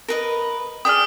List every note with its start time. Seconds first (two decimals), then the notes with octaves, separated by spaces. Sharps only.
0.08 A#4 B4 D#5
0.85 G#4 D5 G5 D#6 F6